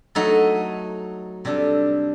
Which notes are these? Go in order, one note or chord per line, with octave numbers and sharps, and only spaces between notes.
F#3 A3 D#4 A4
C3 G3 D4 A4